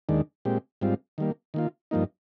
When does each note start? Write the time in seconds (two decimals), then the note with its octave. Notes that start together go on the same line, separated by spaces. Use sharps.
0.09 D#2 D#3 G#3 D4
0.45 A#2 G#3 C4 G4
0.81 G#2 G3 C4 F4
1.18 D#3 G3 A#3
1.54 D#3 A#3 F4
1.91 G2 F3 A#3 D#4